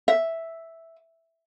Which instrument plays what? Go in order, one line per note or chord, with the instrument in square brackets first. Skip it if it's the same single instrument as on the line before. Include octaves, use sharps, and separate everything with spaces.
[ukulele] E5